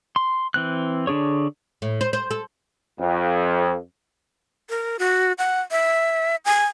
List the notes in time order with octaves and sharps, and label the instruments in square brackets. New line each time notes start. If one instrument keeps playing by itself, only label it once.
[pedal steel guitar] C6
E3 C4 F#6
D3 D4 G#4 C#5
[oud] A2
C5
C5
A4
[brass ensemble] F2
[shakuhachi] A#4
F#4
F#5
E5
G#5